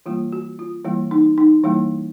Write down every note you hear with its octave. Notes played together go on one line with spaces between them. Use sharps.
E3 G3 A#3 F4
F#4
F4
E3 G3 A#3 E4
D#4
D#4
E3 G3 A#3 E4